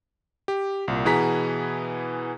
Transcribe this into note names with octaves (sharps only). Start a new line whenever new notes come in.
G4
C2 A#2
B2 E3 B3 G#4 A#5 B6